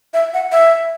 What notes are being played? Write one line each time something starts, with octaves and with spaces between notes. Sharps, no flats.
E5
F#5
E5